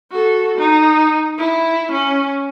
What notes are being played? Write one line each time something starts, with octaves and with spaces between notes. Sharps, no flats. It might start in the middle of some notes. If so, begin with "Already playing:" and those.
F#4 A4
D#4
E4
C#4